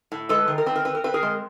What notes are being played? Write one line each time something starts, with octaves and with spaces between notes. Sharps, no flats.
A2
G#3 A4 B4
D#3
A#4
C4 B4
A#4
C4 B4
A#4
C4 B4
G#4 A#4
G#3